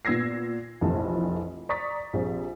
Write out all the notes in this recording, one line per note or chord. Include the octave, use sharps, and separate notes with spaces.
A#2 B3 E6 G#6 A#6 C7
F1 A#1 F2 E3 A5
D5 A#5 C#6 D#6 A6 B6
A#1 C3 G#4 C5